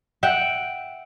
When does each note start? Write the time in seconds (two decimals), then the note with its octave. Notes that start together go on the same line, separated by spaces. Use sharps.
0.23 E5 F#5 G5